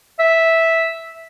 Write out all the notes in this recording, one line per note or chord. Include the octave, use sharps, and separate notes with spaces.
E5